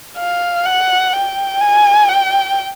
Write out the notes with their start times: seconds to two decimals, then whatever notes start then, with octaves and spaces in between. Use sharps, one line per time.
0.17 F5
0.65 F#5
1.13 G5
1.61 G#5
2.09 G5